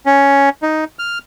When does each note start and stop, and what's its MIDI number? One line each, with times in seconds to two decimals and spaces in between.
0.06 0.49 61
0.62 0.84 63
0.99 1.18 89